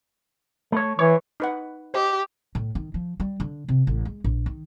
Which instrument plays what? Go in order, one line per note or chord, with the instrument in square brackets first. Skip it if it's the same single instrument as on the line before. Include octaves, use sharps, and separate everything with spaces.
[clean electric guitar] A3 C#5
[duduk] E3 [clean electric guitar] C#5
[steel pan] D#4 B4 F#5
[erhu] G4 [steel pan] C5 D#5
[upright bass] A2
D#3
F3
G3
D3
C3
A1
G#3
A#1
D#3